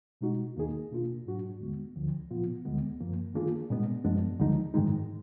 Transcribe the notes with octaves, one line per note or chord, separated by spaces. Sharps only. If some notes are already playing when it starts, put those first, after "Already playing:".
B2 G#3 D#4 F#4
D#2 D#3 A#3 D#4 G#4
B2 A#3 D4 F4
G#2 F#3 D4 F#4
D#2 D3 G#3 B3
D2 D3 F3
A#2 F3 B3 F4
D2 D3 G#3 B3
F#2 F3 A#3
D#3 A#3 D4 F4 G#4
A#2 G#3 B3 D4
F#2 F3 G#3 B3 D4
D2 D3 F3 G#3 D#4
G#2 D#3 G#3 D#4